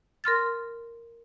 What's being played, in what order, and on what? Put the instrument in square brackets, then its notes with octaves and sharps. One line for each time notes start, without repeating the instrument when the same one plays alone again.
[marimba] A#4 C6 F6 A6